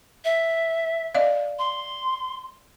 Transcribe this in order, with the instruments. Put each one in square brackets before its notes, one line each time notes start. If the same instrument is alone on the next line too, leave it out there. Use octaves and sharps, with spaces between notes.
[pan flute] E5
[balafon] D5 D#5 F5
[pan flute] C6